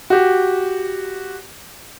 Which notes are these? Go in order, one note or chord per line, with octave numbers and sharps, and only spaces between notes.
F#4 G4